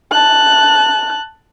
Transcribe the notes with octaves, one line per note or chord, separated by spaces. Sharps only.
A5 F#6